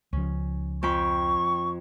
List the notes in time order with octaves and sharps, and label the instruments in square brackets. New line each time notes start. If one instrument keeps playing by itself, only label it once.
[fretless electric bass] C#2 F3 [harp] C#4
[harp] F2 G5 B5 [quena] C#6